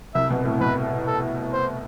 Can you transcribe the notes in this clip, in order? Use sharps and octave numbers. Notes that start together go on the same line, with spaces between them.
C2 C3 E5
B2
A2
B2 B4
A4
C5